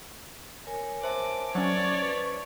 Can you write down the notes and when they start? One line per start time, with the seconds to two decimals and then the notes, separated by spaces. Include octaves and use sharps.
0.67 A#4 C#5 G#5
1.04 C5 E5 A5 D6
1.55 F#3 C#4 C#5 D5 C#6
2.00 B4 C#6